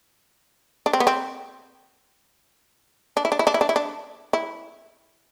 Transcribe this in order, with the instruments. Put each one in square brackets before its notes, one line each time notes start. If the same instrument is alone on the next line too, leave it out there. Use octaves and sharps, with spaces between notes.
[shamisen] D4
C4
B3
C4
D4
E4
D4
E4
D4
E4
D4
E4
D4
E4